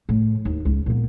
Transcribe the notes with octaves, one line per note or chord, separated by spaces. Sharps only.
A2
D#2
C#2
A#2 B3